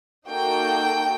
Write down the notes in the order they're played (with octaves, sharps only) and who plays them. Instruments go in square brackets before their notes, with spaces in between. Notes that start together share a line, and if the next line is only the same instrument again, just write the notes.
[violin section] A#3 D#4 F#4 A4 G5